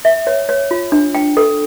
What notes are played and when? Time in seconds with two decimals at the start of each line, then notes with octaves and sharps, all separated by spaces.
0.05 E5
0.27 C#5
0.49 C#5
0.71 F4
0.92 D4
1.15 G5
1.37 A4